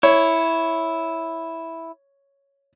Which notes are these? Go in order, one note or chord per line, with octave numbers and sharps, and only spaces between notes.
E4 C#5